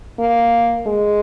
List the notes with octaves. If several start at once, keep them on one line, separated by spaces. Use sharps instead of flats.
A#3
G#3